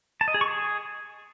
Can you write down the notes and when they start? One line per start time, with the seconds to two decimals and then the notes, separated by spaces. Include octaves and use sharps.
0.21 A5
0.28 D#5
0.34 G#4
0.41 C#6
0.48 G#4